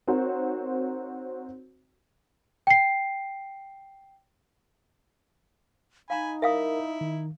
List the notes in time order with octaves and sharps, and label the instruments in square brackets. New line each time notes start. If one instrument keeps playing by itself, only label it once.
[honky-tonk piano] C4 D#4 F#4 A#4 C5 C#5
[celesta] G5 C7
[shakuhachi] D#4 [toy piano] F5 A#5 [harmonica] G#5 B5
[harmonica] E4 [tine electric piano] A#4 [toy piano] E5 F5 D#6
[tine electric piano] D#3